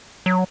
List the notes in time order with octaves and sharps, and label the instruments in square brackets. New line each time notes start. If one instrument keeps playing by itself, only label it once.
[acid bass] F#3